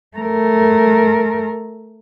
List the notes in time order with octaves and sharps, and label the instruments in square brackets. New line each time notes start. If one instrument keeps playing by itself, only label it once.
[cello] A3 A#4